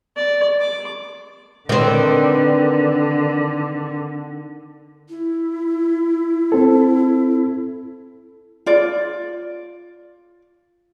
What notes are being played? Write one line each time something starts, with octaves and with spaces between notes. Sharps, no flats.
D5
D6
D3 D#3 C4 B4 D5
E4
C4 A4
F4 D5